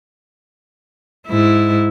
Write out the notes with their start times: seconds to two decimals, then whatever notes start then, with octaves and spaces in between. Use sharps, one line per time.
1.27 G#2 E4